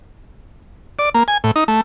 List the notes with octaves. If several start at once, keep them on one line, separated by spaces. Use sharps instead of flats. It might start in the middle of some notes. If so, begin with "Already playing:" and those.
D5
A#3
G#5
A2
D#4
A3